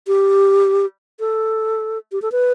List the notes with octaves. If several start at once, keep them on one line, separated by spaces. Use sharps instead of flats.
G4
A4
G4
A4
B4